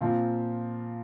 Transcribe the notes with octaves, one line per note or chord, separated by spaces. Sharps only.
A#2 F3 C4 F4